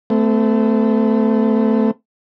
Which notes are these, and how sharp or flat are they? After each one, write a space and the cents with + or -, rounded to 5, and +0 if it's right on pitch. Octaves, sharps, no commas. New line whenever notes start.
A3 +0 C4 -45